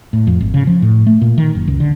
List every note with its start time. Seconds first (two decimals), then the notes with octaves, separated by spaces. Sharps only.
0.13 A2
0.27 F2
0.41 G#1
0.54 C#3
0.67 F3
0.82 A2
1.07 A3
1.21 A#2
1.38 D#3
1.55 F#1
1.67 C#2
1.80 D3